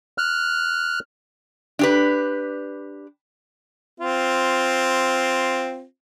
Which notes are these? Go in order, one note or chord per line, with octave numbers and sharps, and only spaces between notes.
F6 F#6
D4 G4 B4
C4 F4